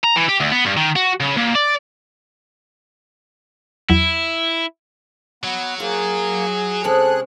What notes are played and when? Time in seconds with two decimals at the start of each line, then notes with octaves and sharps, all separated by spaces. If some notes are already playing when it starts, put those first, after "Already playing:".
0.04 A#5
0.16 E3
0.29 G4
0.40 D2
0.52 B3
0.65 G2
0.77 D#3
0.96 F#4
1.20 C#3
1.37 A#2
1.55 D5
3.90 E2 F#3 E4
5.44 F#3 B3
5.80 A#3 F4 G#4
6.84 C3 G#3 C#4 G#4 A4 F#6